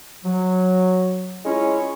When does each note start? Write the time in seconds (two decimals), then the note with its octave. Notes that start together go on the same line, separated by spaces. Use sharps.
0.24 F#3
1.44 G#3 C#4 E4 F4 C#5